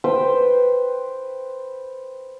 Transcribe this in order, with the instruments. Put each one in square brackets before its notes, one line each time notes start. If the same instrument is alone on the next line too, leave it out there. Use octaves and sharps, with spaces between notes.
[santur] B4 C5 G5